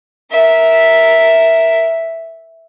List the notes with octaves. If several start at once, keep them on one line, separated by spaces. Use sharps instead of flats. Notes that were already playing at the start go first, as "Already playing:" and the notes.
A#4 E5